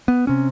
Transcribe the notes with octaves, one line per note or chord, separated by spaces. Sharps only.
B3
C3 C#4